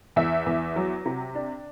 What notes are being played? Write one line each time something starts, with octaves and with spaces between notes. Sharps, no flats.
E2 E5
E2
F#3
C3
D4